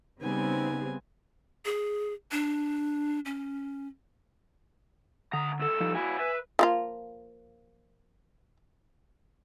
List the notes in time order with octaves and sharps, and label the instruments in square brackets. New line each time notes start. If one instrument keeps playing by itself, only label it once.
[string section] C#3 G3 C4 [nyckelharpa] B3 G#5 [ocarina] D#4
[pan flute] G#4
D4
C#4
[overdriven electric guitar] C#2 A#5 [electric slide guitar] D3 [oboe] D#6
[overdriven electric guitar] C2 A4 [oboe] E6
[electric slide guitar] F3 G3 D#4
[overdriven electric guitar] A#3 F#4 [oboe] E4 [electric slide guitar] G#5
[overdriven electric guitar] B4 [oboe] E5
[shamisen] F3 A#3 F4